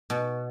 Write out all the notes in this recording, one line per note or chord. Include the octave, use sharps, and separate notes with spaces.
B2